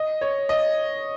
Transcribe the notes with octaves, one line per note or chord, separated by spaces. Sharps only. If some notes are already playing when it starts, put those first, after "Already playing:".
Already playing: D#5
C#5
D#5